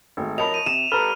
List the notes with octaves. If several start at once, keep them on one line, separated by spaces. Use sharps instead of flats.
G#1 A3
F3 A#4 C#5 D#5 A5 B5 F7
D#7
C3 E7
G3 A4 B4 A#5 B5 F6